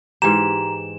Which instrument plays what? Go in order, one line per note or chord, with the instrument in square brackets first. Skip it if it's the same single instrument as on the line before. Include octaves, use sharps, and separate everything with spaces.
[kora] G#2 E3 G4 [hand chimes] A#5 [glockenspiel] E7